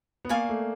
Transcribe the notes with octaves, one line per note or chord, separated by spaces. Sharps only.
B3
A#3 D5 F5 G#5 C#6
A3